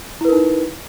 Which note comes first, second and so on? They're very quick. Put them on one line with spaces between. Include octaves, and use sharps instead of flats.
E4 B4 A#4 D#4